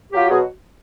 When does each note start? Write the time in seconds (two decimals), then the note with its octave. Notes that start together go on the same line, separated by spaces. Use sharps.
0.12 F#3 F4 G4
0.29 B2 F#4 G#4